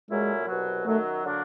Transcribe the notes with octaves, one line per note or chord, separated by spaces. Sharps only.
A#2 F#3 G#3 A3 C#4 E4
C2 B2 F#3
F#2 D#3 F#3 A3
D3 F#3 A#3 D4